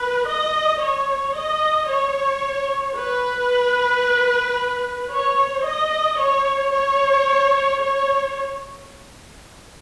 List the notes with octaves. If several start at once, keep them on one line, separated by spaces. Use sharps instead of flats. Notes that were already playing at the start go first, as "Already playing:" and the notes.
Already playing: B4
D#5
C#5
D#5
C#5
B4
C#5
D#5
C#5
C#5
C#5